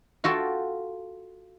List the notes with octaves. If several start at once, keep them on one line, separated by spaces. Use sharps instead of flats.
F4 F#4 A4 G5